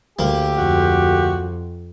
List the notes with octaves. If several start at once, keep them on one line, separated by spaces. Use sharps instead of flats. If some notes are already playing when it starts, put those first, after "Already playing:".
D2 A#3 G4
F2 F#4